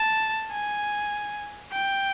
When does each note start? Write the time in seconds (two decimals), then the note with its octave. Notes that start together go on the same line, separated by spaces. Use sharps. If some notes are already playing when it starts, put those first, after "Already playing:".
Already playing: A5
0.52 G#5
1.73 G5